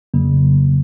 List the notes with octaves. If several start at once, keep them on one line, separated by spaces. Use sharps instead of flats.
F2 C#3 F#3 A#3